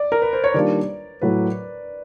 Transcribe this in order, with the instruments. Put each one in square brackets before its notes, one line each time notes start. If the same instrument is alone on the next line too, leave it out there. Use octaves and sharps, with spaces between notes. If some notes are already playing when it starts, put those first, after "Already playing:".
Already playing: [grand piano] D5
A#4
B4
C5
C#5
[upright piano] D#3 G3 A#3 D4 F4 [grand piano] D5
[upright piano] A2 F#3 A3 [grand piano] B4